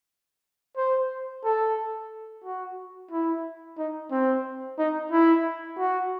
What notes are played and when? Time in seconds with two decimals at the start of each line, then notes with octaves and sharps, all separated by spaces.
0.77 C5
1.44 A4
2.44 F#4
3.11 E4
3.78 D#4
4.11 C4
4.78 D#4
5.12 E4
5.78 F#4